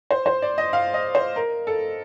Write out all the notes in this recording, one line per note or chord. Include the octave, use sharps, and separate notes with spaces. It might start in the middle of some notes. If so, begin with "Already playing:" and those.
C5
C5
D5
D#5
F5
D#5
C5
A#4
A4